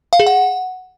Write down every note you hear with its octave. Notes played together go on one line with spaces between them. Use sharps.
F5
G#4
F#5